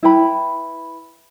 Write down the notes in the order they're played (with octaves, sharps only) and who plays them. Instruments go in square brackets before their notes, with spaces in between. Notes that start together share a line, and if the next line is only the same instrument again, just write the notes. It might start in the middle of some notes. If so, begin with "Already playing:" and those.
[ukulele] E4 B4 G5 B5